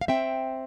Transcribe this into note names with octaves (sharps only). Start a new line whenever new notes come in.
F5
C4 E5 G5